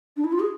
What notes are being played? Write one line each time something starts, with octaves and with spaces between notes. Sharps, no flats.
D4
E4
F4
G#4